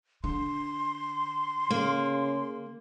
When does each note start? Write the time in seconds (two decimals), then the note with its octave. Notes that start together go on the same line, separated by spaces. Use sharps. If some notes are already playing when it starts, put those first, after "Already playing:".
0.24 D3 C6
1.70 C#3 A#3